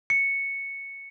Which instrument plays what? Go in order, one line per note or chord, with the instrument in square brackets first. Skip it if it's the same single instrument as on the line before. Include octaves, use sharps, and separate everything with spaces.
[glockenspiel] C#7